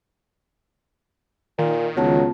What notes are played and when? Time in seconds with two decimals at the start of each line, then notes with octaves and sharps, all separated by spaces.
1.59 A#2 D#3
1.97 C#2 F#3 B3 F4 A5